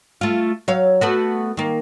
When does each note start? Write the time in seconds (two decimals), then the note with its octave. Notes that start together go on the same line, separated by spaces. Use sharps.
0.21 A3 F4
0.68 F#3 C#5 F5
1.01 A3 B3 F#4
1.57 D#3 A#3